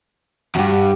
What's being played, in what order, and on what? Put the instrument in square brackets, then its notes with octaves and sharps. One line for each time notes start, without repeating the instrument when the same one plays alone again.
[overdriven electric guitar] E2 G2 [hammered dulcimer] F#4 G4